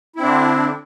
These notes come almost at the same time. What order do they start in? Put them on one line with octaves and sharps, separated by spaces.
E4 C4 D4 D3